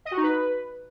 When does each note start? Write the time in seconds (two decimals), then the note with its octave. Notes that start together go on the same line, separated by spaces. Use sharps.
0.05 D#5
0.11 F#4
0.17 D#4
0.23 B4